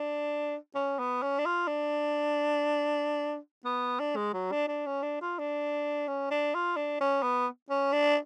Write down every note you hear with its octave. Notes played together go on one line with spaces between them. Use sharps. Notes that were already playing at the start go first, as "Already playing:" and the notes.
Already playing: D4
C#4
B3
C#4
D4
F4
D4
B3
D4
G#3
F#3
D4
D4
C#4
D4
F4
D4
C#4
D4
F4
D4
C#4
B3
C#4
D4